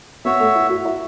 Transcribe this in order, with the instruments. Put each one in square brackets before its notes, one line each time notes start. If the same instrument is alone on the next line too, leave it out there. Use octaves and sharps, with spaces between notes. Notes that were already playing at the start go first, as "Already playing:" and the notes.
[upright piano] B3 [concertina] F#4 C#5 E5
[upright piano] A3
E4
F#4
E4